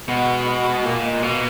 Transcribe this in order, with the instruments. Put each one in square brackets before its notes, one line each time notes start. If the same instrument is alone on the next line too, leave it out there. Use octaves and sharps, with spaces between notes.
[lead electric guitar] B2 [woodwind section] G#3 B3
[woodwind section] G#3 B3
[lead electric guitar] A#2 [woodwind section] A#3
[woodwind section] G#3
[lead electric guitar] B2 [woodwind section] A#3